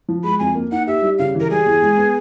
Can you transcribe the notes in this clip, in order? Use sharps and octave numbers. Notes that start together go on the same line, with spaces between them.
F3
G#3 B5
F2 G#5
A#3
D#4 F#5
G4 E5
G3
C#3 F5
E3
A#4
G3 G#4
E2
G#3
B3